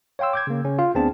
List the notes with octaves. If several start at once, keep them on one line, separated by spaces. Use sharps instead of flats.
C#5 F5 G5 C6 E6
D6 G6 G#6
C#3 A#3
C#3 C#4
F4 F5
D2 B3 C4 D4 G#4 A5